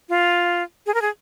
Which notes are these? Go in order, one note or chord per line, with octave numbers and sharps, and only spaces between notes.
F4
G#4
A#4
G#4